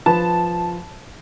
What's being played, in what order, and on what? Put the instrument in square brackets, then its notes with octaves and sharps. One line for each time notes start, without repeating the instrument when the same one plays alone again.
[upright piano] F3 B4 [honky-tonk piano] A5